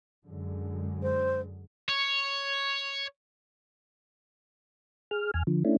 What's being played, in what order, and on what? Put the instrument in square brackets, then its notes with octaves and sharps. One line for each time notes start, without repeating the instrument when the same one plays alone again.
[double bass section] F#2 D3 G#3
[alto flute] C5
[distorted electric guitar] C#5
[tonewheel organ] G#4 F6
E2 G#5 F6
D3 F3
A3 C#4 D4 E4